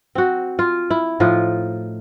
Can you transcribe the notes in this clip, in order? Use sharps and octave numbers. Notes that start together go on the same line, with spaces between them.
C4 F#4
F4
E4
A2 F3 D#4 F4